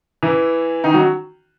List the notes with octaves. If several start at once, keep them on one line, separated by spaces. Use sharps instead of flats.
E3 E4
D#3 D#4
F#3 F#4